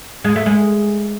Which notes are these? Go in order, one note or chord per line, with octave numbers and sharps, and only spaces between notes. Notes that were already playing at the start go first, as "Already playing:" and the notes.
G#3
A3
G#3